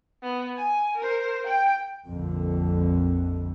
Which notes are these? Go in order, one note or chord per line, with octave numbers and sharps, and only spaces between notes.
B3
G#5
A#4 C5
G5
A#1 F2 D3